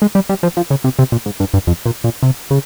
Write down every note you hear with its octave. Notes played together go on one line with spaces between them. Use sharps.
G#3
G3
G3
F3
F3
C#3
C3
C3
A#2
G#2
G2
G2
F2
A#2
A#2
C3
C#3